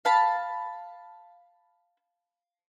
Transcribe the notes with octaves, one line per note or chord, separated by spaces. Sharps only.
F5 A5 B5